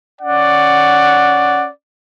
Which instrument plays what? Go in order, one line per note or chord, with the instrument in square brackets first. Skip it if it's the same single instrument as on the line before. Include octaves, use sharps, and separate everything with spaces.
[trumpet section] C#4 F#5 [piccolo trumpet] D5